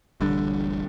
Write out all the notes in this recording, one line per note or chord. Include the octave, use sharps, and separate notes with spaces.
D1 A1 D3 G3